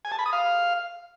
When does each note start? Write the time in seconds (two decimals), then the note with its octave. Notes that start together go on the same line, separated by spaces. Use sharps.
0.05 G#5
0.12 A5
0.19 B5
0.26 D#6
0.33 F5